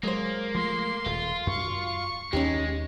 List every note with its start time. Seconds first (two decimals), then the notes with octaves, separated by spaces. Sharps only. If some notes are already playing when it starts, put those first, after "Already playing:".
0.03 F#3 G#3 A#3 C5
0.55 F3 A3 C6
1.06 D#1 F4
1.47 F#2 C#6
2.33 D#2 G#3 C#4 D#4 G4